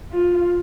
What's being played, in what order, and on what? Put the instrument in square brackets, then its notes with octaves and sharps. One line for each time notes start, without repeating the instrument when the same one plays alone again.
[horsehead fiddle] F4